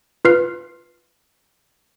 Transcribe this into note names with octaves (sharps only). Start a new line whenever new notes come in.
F4 B4 F6 C7